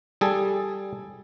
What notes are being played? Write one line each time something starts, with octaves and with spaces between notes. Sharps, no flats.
G3 G#4 A4